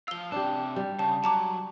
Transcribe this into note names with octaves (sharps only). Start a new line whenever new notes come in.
F3 F5 E6 G7
C3 D4 G4 A5
G3
C#3 A5
F#3 A5 A#5 D6